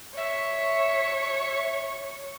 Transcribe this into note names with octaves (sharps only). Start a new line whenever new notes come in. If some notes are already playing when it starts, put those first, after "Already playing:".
C#5 E5